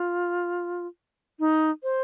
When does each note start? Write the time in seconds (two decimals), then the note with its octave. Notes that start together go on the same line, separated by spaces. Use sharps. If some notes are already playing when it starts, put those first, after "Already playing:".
Already playing: F4
1.40 D#4
1.83 C5